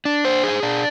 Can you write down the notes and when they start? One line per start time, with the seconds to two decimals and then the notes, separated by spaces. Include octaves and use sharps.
0.05 D4
0.25 C5
0.44 G#4
0.63 D4